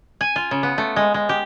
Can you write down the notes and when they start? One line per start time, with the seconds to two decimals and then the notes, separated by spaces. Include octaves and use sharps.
0.21 G#5
0.36 F4
0.51 C#3
0.63 B3
0.78 A3
0.96 G#3
1.14 G#3
1.29 G4